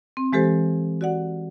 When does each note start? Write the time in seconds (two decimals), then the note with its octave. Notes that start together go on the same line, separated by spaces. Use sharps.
0.17 C4
0.33 E3 G#3 G4 A4 C5
1.01 F#4 D5 F#5